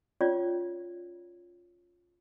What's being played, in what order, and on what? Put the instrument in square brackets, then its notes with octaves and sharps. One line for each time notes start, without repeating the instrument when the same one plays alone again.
[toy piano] C#4 F4 C#5 D5